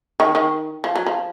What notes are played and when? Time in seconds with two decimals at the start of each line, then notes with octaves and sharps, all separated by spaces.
0.20 D#3
0.35 D#3
0.84 F3
0.96 F#3
1.06 F3